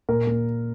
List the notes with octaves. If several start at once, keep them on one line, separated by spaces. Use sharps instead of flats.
A#2 A#4
A#3